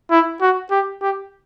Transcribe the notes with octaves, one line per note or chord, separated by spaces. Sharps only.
E4
F#4
G4
G4